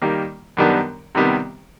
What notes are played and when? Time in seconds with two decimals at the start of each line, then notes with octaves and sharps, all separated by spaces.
0.02 D#3 G3 A#3
0.57 F#2 D#3 G3 B3 D4
1.15 C3 D#3 G3 B3